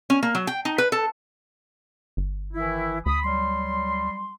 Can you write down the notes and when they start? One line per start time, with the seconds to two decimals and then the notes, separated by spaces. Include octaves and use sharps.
0.10 C#4
0.23 A#3
0.35 F#3
0.47 G5
0.65 D#4
0.78 B4
0.92 A4
2.17 G1
2.53 D#3 E3 E4
3.06 D2 B5 D#6
3.24 F#3 G3 C6